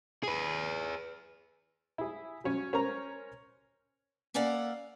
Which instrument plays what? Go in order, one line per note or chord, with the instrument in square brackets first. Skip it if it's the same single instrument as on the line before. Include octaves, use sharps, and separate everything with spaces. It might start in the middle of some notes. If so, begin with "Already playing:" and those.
[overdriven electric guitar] G#4 B4
[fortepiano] E4 G#4
F#3 C#4
C#4 A#4 C5 C#5 A#5
[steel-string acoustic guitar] A#3 C#4 A4 D5 F5 F#5